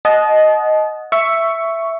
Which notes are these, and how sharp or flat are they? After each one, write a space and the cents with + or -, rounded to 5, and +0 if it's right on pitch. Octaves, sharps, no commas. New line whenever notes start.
D#5 +0 F#5 -10 A5 -35
E5 +10 C#6 +5